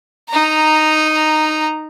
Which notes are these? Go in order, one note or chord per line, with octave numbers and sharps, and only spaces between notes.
D#4 A#5